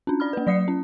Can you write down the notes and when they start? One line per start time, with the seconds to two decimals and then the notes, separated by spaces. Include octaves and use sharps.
0.07 C#4 D4
0.20 D5 B5 F6
0.33 A#3 B4
0.47 F#3 D5 D#6 C7 C#7
0.68 C#4